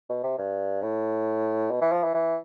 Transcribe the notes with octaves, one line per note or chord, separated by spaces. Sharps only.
B2
C3
G2
A2
B2
E3
F3
E3
E3